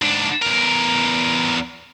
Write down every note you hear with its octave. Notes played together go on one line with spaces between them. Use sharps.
G#2 D4
E2 A#4